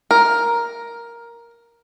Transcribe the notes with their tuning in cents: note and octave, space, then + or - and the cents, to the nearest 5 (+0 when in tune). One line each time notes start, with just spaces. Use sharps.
A#4 +5